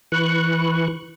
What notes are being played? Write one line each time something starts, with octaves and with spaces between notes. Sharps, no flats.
E3 B4 C#6 F#6